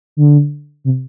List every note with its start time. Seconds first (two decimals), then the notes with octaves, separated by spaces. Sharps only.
0.17 D3
0.85 C3